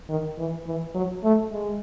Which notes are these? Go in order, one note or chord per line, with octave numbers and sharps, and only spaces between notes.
D#3
E3
E3
F#3
A3
G#3